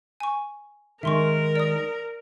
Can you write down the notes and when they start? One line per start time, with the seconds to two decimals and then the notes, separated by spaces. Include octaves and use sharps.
0.20 G#5 C#6
1.03 D#3 G#3 A#4 E5 C6 C#6
1.56 D5 D#6